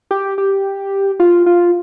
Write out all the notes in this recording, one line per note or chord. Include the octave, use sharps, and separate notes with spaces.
G4
G4
F4
F4